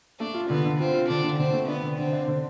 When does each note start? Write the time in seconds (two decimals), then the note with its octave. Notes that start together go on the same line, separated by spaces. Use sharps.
0.20 A3 D4
0.34 F4
0.50 D3 B3
0.64 D3
0.79 C4 F4
0.94 F4
1.08 D3 D4
1.24 D3
1.39 D3 C4
1.53 A3
1.68 B3 D4
1.83 D3
1.98 D3 C4
2.13 D4
2.27 D3